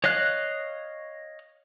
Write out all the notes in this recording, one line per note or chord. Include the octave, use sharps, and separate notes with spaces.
C#5 D#5 F5 F#6